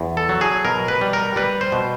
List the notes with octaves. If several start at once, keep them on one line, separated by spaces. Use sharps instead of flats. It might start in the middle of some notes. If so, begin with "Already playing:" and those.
Already playing: E2
A4
F#3
G#4
B2 A#4
B4
G3
A#4
G3 B4
C5
B2